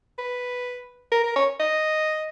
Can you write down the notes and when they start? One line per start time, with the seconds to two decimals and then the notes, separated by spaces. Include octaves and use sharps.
0.19 B4
1.12 A#4
1.23 A#4
1.36 C#5
1.60 D#5